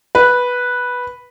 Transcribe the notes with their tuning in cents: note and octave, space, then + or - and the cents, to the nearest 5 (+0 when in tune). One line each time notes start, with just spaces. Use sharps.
B4 -5